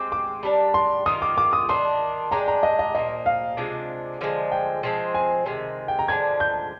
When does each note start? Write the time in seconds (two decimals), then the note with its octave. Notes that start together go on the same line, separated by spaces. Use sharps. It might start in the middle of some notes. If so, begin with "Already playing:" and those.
Already playing: G#3 C4 G4 D6
0.12 D6
0.43 G3 D4 G4 A#4
0.74 C6
1.06 D#3 A#3 F4 D#6
1.22 D6
1.38 D6
1.53 D#6
1.69 D#3 A#3 D4 C6
2.31 G#3 D4 G4 A#5
2.48 A#5
2.63 D#5
2.79 D#5
2.95 A#2 F3 A#3 D#5
3.26 F5
3.57 C3 F3 G#3 D4
4.21 D3 F3 G#3
4.52 G5
4.83 F3 G#3 C4
5.15 G#5
5.46 C3 D#3 G#3
5.88 G5
5.99 A#5
6.08 D3 F3 G#3 D4 G#6
6.40 G6